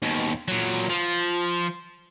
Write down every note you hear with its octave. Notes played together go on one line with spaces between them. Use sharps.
D#2 B2
A#2 F#3
F3